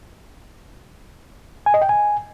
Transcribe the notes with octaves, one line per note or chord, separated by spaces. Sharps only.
G#5
D#5
G5
G#5